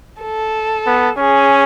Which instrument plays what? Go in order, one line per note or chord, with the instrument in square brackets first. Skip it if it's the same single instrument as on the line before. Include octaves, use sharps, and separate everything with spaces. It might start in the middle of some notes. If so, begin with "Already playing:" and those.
[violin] A4
[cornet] B3
[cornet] C#4 [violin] G#4